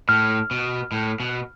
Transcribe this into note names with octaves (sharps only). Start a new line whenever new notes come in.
A2 F6
B2
A2
B2